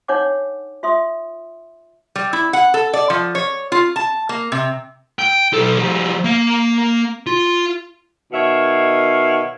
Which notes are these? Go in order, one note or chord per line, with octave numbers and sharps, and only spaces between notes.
D4 D#4 C#5 F#5 D6
F4 E5 C6 D#6
G3
E4
F#5
A4
D5
F3
C#5
F4
A5
A#3
C3
G5
B1 A4
F3 G3
A#3 F5
F4
B2 D#3 C#5 E5 F5